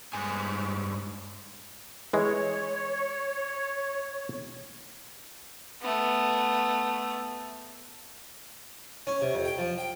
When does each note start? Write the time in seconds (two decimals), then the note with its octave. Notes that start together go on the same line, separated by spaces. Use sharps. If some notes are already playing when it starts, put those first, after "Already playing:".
0.13 G2 G#3 G#5
2.13 E3 G#3 C#5
5.81 A3 B3
9.07 C#4
9.21 C3
9.33 F2
9.45 G5
9.58 F3
9.78 G5